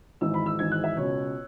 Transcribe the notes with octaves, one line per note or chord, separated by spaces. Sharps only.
G#1 G#2 E3 E6
B5
E6
G#1 G#2 E3 G#6
F#6
E5
C#2 B2 C#5